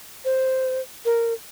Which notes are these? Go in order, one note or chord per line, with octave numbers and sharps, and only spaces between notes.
C5
A#4